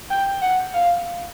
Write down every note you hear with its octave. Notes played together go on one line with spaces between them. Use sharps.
G5
F#5
F5